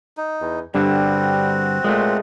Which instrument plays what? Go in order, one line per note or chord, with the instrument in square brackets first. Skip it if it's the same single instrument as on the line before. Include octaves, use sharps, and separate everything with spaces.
[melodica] D#4
[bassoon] E2
[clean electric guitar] G2 D3 [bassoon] G3 [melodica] C4 F#4
[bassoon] A#2 [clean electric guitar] G#3 A3